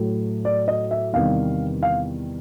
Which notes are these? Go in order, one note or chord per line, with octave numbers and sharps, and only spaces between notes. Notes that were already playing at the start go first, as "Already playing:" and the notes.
Already playing: A2 F#3 A3
D5
D#5
E5
E2 C3 D#3 G3 F5
F5